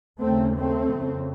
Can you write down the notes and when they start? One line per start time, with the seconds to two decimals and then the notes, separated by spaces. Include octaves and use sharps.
0.20 D#2 C#3 A3 C4
0.56 A3 C4
0.91 F2 C#3